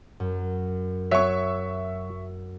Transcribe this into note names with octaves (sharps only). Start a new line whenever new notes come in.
F#2
F#3 C#5 E5 C#6